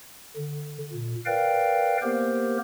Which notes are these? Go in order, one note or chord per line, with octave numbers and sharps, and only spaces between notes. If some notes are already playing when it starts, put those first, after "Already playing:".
D3
A#2
A#4 B4 D5 F5 G5
A#3 B3 G4 A#4 C5